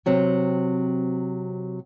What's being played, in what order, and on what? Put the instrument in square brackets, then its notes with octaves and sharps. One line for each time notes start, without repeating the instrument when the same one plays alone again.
[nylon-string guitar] C3 F#3 C4